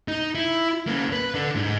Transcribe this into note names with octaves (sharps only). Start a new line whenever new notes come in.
D#4
E4
A#3 C#4
B4
D3 D4
G#2